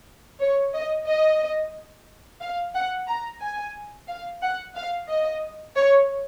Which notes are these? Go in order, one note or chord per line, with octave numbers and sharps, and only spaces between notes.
C#5
D#5
D#5
F5
F#5
A#5
G#5
F5
F#5
F5
D#5
C#5